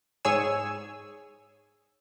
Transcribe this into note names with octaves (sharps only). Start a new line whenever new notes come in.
G#2 G#4 C#5 G#5 E6